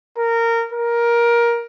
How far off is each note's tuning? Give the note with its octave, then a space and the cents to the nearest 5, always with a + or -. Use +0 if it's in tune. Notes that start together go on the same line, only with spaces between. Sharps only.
A#4 -15
A#4 +15